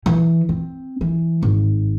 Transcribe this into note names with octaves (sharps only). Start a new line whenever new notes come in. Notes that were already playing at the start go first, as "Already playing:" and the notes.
E3
C4
E3
G#1